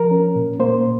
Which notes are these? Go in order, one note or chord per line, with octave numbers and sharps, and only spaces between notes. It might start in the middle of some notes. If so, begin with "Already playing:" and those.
Already playing: F3 A#4
C#4
A#2
A#3 C5